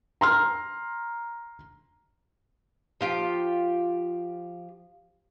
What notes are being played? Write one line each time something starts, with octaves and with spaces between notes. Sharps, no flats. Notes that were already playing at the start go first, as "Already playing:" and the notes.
A#5 C6 F6
F3 F4 G4